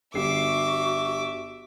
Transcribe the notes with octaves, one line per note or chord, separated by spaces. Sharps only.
G1 G3 F#4 E5 D6 C7